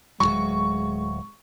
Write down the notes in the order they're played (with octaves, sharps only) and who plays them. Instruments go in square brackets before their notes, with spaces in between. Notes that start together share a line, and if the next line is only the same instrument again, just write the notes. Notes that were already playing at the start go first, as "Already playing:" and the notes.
[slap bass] D1 A#1 F#3 [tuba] G#3 [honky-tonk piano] C#6